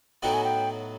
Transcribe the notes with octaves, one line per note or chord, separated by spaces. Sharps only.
A2 F#3 B3 D#4 F#4 G5
G#5
G5